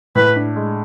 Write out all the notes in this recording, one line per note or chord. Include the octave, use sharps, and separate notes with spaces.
A2 B4
D4
G#3